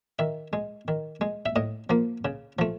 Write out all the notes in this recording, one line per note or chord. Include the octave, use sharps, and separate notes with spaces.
D#3 E5
G#3
D#3
G#3
E5
A2 D#5
F3 A#3
C#3
F3 A3